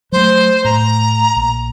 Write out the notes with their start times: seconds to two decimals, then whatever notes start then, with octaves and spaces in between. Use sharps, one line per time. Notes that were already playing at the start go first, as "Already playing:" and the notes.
0.12 F#3 A3 C5
0.64 A2 A#5
1.36 A#1